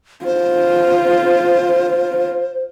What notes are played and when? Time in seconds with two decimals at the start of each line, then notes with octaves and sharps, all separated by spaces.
0.25 F4 C5